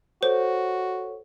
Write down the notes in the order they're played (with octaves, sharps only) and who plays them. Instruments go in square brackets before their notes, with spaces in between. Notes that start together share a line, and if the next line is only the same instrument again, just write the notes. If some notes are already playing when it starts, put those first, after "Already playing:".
[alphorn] F#4 [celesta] A4 C#5 [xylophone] C5